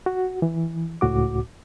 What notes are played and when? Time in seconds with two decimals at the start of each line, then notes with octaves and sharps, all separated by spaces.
0.06 F#4
0.42 E3
1.01 C#2 A2 F#4 D6